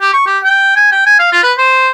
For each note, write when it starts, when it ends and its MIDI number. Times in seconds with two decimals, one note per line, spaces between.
0.01 0.11 67
0.13 0.24 85
0.27 0.38 67
0.44 0.73 79
0.76 0.92 80
0.92 1.02 79
1.06 1.18 80
1.19 1.30 77
1.32 1.41 65
1.43 1.53 71
1.58 1.91 72